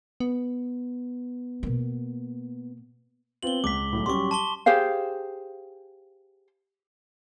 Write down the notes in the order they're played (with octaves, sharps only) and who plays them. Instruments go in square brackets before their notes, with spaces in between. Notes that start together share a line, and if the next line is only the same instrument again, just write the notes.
[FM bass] B3
[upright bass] B2 A#3
[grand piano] B3 C4 F4 [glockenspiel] F#7 G7
[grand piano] C#2 [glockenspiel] D6 B6
[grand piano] B1 A2
[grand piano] F#3 G3 C#4 [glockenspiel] C6 C#6
[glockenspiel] A5 C6 G7 [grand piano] D#7
[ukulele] G4 G#4 C5 F5